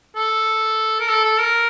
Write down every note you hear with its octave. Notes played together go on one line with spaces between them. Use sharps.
A4
A#4
A4
A4
A#4